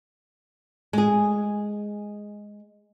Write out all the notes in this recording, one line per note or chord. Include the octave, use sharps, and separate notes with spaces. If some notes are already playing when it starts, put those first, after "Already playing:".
G#3 G#4